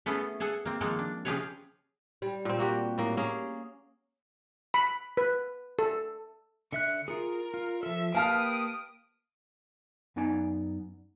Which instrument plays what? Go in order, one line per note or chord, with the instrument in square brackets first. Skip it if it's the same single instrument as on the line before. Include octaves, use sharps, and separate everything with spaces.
[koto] A3 B3 C#4 E4 G#4 A4
G#4 A4 F#5 G#5
A#3 C4
D#3 F3 G#3 A#3 A4
D4
C#3 F3 G4 G#4 B4 C#5
[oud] G3
[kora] A#2 C4
A#3 F#4 G4
A2 A#3
A#3 C#4 G#4
[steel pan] B5
B4
A4
[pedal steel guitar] D3 E5 F#6 [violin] C#7
[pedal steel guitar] F4 G#4 [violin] A#4
[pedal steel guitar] F4
[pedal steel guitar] F3 A4 [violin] E5
[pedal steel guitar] A#3 G4 B4 [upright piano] F5 A5 F6 [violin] D#6 D7
[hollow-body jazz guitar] F#2 B3 D#4 D5 G#5